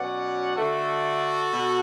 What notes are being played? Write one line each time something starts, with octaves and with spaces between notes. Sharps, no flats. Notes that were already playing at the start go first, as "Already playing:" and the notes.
Already playing: B2 F#3 C#4 D5 F#5
D3 A3 D4 F#4 A4
B2